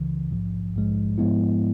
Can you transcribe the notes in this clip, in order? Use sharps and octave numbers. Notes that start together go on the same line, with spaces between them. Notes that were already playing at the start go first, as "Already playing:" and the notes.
Already playing: C#2 C#3 E3
A#1 G#2 F3
A#1 G#2 F3 G#3
G#2 F3 G#3 B3 E4